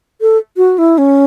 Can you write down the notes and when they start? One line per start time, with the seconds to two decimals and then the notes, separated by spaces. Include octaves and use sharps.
0.21 A4
0.57 F#4
0.78 E4
0.98 C#4